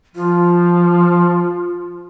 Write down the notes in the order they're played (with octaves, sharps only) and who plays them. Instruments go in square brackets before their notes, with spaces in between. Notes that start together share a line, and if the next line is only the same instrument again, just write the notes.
[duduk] F3 [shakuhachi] F4